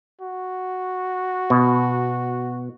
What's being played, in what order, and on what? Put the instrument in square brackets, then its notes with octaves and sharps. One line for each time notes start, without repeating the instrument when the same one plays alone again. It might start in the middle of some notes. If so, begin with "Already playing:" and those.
[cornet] F#4
[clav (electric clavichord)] B2